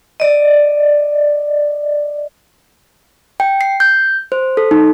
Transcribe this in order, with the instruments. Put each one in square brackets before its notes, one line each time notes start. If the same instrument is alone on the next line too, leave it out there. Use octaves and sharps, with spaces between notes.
[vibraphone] D5 D#5
[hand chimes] G5
C7
G6
C5
A4
D#4